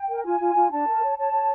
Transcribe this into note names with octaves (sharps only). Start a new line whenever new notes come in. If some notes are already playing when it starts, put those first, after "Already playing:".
Already playing: G5
A#4
F4 G#5
F4
F4
D4 A5
A#4
C#5
C#5 A5
C#5